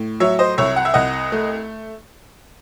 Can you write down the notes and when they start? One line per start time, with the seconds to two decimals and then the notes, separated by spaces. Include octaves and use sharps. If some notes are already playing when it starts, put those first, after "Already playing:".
Already playing: A2
0.20 F#3 C#5 E5
0.39 C5 D#5
0.58 C2 C#5 E5
0.76 F#5
0.85 E5
0.94 C2 D#5 F#5
1.32 A3